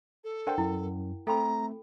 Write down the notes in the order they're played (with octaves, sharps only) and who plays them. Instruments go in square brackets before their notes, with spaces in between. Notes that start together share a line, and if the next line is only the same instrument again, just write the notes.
[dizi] A4
[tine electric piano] D4 C5 [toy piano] A#4 F#5 G5
[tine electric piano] F#2 [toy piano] E4
[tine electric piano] A3 C4 [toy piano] A4 G5 B5 [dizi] A#5